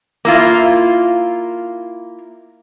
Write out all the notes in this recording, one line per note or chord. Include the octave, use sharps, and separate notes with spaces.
A#3 E4 F4